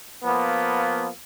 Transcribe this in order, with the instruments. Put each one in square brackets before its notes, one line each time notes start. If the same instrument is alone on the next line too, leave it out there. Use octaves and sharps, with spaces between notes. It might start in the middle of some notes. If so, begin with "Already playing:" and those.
[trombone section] F3 A#3 B3